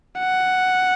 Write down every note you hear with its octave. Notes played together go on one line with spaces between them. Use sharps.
F#5